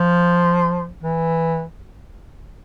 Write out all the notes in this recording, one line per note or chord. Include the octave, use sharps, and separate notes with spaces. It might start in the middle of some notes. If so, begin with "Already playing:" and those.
Already playing: F3
E3